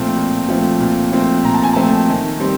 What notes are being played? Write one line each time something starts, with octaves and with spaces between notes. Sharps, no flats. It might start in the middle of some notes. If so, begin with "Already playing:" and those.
Already playing: A#2 F3 A3 C4 A5
A#2
F3 A3 C4
A#2
F3 A3 C4
A#2 A#5
A5
G#5
F3 A3 C4 A5
D#3
G3 C4